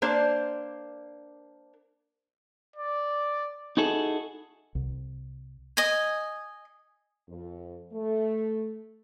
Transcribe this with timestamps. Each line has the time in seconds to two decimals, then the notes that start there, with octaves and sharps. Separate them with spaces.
0.02 A#3 D4 C5
2.76 D5
3.77 D#4 E4 F#4 G#4 A4
4.75 C2
5.77 D#5 G#5
7.29 F2
7.93 A3